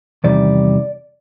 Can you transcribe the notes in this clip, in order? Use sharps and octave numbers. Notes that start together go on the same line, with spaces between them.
E2 C3 D#3 G3 D5